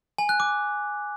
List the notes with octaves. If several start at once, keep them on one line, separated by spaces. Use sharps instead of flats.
G#5
F#6
D6